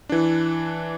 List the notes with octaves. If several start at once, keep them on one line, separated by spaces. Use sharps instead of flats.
E3 D4